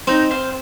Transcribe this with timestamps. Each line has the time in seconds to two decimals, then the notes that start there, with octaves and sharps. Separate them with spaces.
0.07 C4 D#4
0.31 C5 F5